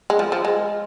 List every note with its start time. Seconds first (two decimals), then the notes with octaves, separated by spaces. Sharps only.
0.10 G#3
0.19 F3
0.32 F3
0.45 G#3